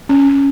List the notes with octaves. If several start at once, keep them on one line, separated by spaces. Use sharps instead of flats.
C#4